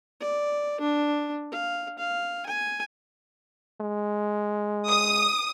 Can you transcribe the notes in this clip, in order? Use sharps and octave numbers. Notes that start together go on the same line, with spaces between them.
D5
D4
F5
F5
G#5
G#3
D#6